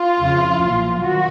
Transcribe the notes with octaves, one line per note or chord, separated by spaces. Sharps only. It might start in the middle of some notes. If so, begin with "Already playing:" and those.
Already playing: F4
F2 C#3 F3
B1 A#2 F3
D#3 F#3 F#4